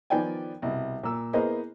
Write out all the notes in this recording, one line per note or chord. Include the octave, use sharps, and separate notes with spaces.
D#3 F3 B3 D5 G5 G#5
C2 B2
A#2 E6
A#3 B3 E4 G#4 C5 D#5